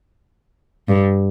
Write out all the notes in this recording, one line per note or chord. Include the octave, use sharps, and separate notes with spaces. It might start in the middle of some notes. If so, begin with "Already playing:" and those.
G2